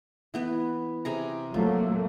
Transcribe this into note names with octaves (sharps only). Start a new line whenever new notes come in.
E3 B3 B4
C3 G#4 A#5
F3 F#3 A3 A#3